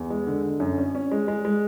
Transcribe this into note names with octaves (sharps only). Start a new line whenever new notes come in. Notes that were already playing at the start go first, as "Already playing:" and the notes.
Already playing: E2
G#3
D3
D3
F#2
C#4
C#4
G#3
G#3
G#3